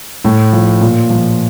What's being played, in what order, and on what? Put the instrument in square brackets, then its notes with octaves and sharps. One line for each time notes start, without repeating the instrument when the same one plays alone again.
[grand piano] A2
F3
A#2
F3